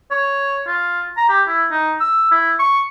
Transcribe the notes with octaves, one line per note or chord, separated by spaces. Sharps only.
C#5
F4
A#5
G4
E4
D#4
E6
E4
C#6